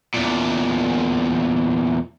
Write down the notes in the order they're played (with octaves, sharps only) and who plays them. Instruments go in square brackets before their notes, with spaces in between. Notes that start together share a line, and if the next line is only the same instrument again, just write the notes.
[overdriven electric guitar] E2 A#2